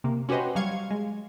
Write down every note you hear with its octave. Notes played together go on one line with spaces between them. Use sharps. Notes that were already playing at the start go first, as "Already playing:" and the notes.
C3 A#3
C#4 F#4 G4 B4 C5 D#5
F#3 G3 F5 C#6 G#6
G#3